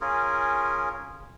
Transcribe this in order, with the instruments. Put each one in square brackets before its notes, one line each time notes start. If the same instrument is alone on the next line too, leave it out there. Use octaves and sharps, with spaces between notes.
[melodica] C#4 F4 G#4 A#4